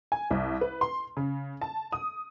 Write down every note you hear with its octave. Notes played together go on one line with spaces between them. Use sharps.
G#5
C2
B4
C6
C#3
A5
D#6